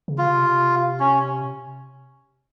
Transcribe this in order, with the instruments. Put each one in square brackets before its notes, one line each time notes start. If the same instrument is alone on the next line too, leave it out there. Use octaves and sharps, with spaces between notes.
[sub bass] C#3
[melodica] F4
[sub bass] C3
[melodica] C#4